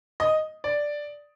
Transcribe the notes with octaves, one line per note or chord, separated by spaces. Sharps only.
D#5
D5